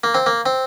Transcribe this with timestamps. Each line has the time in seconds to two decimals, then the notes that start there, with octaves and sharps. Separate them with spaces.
0.04 A#3
0.14 C4
0.26 A#3
0.46 C4